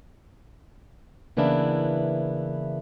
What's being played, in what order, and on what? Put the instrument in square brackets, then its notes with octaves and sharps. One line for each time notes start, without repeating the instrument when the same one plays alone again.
[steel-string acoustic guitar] C#3 E3 A#3 B3 D4 E4